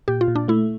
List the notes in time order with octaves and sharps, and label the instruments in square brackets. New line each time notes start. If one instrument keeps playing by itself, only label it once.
[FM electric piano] A#2 [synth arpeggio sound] G4
[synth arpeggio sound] F4
[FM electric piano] A#2
[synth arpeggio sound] D4
[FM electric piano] A3 [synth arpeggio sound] E4